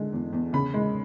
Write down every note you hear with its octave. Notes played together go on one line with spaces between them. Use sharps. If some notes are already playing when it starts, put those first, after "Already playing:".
Already playing: D3 G#3
E2
E2
C#3 B5
G#3